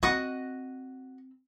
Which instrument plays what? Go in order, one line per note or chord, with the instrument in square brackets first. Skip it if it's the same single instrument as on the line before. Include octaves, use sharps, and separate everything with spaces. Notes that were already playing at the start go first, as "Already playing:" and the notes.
[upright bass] C4 [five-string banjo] F#4 D#5 F#5